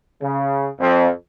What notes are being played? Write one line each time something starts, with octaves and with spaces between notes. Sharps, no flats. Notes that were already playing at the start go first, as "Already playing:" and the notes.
C#3
F2